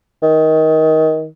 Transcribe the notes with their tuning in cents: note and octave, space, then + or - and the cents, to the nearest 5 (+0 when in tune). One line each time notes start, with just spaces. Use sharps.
D#3 +20